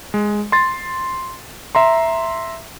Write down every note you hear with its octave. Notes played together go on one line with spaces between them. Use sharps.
G#3
C6 A6
E5 A#5 C6